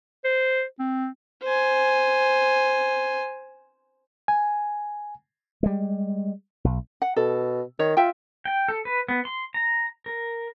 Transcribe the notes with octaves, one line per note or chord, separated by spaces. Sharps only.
C5
C4
C5 G#5
G#5
G3 G#3
B1
F#5
B2 A4
D#3 C#5
F4 E5 G5
G5
A4
B4
B3
C6
A#5
A#4